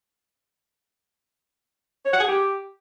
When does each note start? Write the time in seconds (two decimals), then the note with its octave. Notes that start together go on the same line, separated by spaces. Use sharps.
2.05 C#5
2.13 F#5
2.21 G#4
2.28 G4